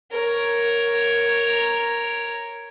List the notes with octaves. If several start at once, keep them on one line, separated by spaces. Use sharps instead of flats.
A#4 C#5